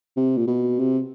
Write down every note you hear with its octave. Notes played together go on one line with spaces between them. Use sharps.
C3
A#2
B2
C3